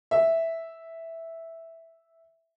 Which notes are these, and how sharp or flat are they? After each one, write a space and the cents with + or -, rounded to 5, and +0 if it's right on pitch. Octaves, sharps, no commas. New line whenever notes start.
E5 -5